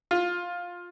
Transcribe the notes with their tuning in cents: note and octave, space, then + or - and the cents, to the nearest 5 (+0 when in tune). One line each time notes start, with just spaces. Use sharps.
F4 +10